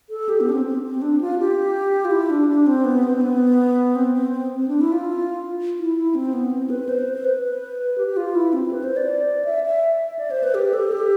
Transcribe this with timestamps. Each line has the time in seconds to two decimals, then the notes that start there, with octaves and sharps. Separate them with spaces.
0.10 A4
0.29 G4
0.41 B3
0.49 D4
0.52 C4
0.66 C4
0.84 C4
1.02 D4
1.21 F4
1.39 G4
2.05 F4
2.11 E4
2.30 D4
2.49 D4
2.66 C4
2.85 B3
3.03 C4
3.21 B3
3.95 C4
4.14 C4
4.32 C4
4.56 C4
4.68 D4
4.81 E4
4.92 F4
5.79 E4
5.96 E4
6.15 C4
6.33 B3
6.51 C4
6.70 B4
6.89 C5
7.14 C5
7.24 B4
7.98 G4
8.08 G4
8.17 F4
8.35 E4
8.53 C4
8.71 B4
8.84 C5
8.97 D5
9.45 E5
9.64 E5
10.19 D5
10.31 C5
10.43 B4
10.54 G4
10.74 A4
10.92 G4